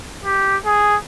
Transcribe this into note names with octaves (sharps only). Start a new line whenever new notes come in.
G4
G#4